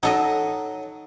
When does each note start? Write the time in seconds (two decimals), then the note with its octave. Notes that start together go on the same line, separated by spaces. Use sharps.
0.03 F#3 D#4 A4 D#5